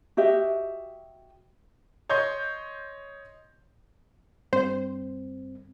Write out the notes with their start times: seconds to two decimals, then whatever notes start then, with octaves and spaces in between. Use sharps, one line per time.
0.17 F#4 G4 D#5 E5
2.09 C#5 D#5 C6 G6
4.53 G2 C4 C5